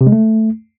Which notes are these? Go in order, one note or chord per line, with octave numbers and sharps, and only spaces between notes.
C3
G#3
A3